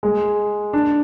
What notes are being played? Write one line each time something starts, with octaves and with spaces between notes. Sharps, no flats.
G#3
D4